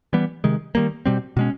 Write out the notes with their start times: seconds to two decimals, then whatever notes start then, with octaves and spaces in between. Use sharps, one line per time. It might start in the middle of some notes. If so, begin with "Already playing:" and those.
0.13 E3 G3 B3
0.44 C3 D#3 G#3
0.75 D#3 G3 A#3
1.06 B2 G3 C4
1.37 B2 G#3 C#4